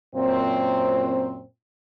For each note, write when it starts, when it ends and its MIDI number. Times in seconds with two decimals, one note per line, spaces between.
0.15 1.44 42
0.15 1.44 46
0.15 1.44 60